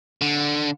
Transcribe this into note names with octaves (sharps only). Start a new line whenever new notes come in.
D3